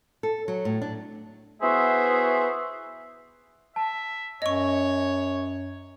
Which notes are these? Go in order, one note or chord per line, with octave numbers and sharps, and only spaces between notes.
A4
F#3
A2
D4
B3 E4 F#4 G#4 C5 E5
E5 A5
F#2 C#5 D#5 C#6